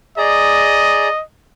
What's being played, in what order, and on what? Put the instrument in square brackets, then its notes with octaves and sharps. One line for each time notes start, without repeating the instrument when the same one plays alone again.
[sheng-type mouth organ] G#4 D5 A#5 [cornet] D#5